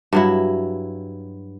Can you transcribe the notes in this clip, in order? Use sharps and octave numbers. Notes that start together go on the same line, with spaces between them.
G2 F#3 E4